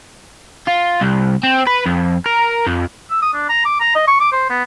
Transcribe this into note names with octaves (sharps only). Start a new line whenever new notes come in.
F4
C2
C4
B4
F2
A#4
F2
E6
D#6
D4
A#5
D6
A#5
D#5
C#6
D6
C5
B3